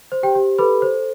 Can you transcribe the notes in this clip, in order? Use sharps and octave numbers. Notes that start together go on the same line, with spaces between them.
C5
G4 G5
G4
A4 B4 B5
C5